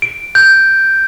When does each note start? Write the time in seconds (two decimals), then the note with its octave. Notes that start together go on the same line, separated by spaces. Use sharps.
0.02 D7
0.35 G6